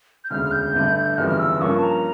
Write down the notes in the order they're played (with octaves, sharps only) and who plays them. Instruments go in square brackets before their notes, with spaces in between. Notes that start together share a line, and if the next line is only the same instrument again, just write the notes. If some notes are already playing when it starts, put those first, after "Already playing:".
[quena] G6
[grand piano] E1 D2 C#3 [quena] F6
[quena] F6
G6
[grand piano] A1 G2 D3 A3
[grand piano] G1 F2 C#3 E3 G3 [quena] F6
[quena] F6
E6
[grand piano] G2 F3 A#3 C#4 [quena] C#6
[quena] A5
A#5